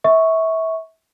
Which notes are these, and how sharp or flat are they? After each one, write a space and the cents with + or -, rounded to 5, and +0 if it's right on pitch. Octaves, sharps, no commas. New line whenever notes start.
E5 -25 C#6 +0